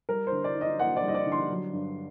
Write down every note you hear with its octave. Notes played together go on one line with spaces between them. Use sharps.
G3 A#4
C5
D3
D5
D#4
D#5
A#3 F#5
D5
G3
D#5
D5
D3
C6
F#3
G2